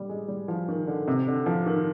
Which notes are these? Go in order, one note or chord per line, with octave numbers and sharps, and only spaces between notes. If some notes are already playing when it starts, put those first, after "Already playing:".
Already playing: D3 G3
G#3
G3
F3
D#3
D3
C3
D3
F3
D#3